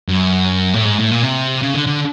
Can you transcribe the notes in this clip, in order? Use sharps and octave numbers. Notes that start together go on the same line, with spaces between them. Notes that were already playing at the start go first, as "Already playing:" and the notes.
F#2
A2
G#2
A2
A#2
C3
C#3
D3
D3